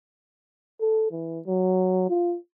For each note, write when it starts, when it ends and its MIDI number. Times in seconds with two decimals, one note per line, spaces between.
0.81 1.09 69
1.11 1.39 52
1.47 2.06 54
2.10 2.36 65